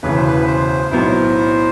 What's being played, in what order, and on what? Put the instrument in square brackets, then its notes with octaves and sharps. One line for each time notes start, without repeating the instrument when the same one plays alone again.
[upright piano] E1 D2 C#3 E3 [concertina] B4
[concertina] C5
B4
C5
[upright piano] B1 A2 F#3 B3 E4 [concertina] C5